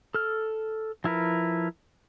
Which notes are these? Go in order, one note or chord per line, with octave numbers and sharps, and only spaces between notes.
A4 F6
F3 E4 A#4 B4